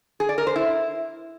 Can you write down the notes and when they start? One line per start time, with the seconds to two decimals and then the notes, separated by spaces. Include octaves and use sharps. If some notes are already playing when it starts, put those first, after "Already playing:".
0.20 G#4
0.29 D5
0.38 A#4
0.47 C5
0.56 E4